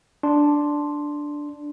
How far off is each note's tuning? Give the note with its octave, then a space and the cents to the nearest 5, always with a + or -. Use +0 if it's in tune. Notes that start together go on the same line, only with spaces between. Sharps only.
D4 +0 C6 +0